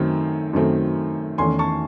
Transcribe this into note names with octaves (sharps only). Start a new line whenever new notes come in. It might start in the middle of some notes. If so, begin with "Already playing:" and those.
Already playing: F#2 D#3 A3 C4
F#2 D#3 A3 C4
E2 D#3 A3 C#4 G#5 C6
A5 C#6